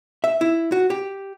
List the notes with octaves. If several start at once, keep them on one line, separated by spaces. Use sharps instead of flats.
E5
E4
F#4
G4